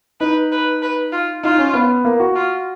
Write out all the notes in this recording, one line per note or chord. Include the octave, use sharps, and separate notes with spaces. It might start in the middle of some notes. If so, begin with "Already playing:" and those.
D#4 B4
B4
B4
F4
D#4 F4
C#4
B3
A#3
F#4
F4